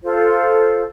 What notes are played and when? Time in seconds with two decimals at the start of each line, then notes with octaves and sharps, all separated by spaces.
0.03 F4 A4 C5